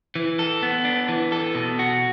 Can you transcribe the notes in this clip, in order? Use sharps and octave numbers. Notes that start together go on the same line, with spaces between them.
E3
A4
B3
D4
E3
A4
B2
F#4